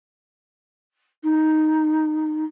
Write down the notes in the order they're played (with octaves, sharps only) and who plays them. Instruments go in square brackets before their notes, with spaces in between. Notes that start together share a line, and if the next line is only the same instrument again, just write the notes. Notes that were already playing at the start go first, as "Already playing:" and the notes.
[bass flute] D#4